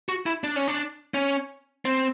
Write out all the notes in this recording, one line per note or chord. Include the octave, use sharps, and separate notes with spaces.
F#4
E4
D4
C#4
D4
C#4
C4